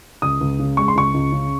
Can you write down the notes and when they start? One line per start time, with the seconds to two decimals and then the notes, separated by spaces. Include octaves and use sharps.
0.22 C#2 D#6
0.41 C#2
0.59 C#3
0.77 G#3 C#6
0.88 C6
0.95 C#2 C#6
1.14 C#2
1.32 C#3